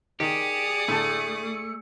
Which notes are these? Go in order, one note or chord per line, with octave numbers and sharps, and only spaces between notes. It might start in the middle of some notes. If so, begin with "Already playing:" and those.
D#3 G4 G#4 D5 D#6 C#7
A2 D3 A3 A5